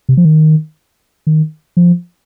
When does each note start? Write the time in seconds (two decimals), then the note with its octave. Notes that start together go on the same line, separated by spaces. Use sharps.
0.09 C3
0.17 F3
0.25 D#3
1.27 D#3
1.77 F3